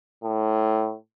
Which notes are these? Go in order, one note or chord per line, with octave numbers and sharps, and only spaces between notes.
A2